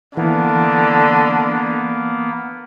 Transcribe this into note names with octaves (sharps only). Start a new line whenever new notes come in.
D3 E3 A#3 B3